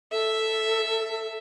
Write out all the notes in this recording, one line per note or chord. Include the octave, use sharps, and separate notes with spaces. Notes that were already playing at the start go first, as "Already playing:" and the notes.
A4 E5